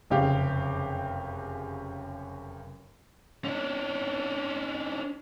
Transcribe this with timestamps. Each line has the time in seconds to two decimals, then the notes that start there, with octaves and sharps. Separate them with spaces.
0.10 F1 F#2 C#3 G4 F5
3.45 C#4 D4